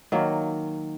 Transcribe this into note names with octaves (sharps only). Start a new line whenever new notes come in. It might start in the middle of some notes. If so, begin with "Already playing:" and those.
D#3 F#3 A#3